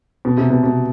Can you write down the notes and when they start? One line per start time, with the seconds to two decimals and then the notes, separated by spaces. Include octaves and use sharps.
0.25 B2
0.37 C3
0.50 B2
0.64 B2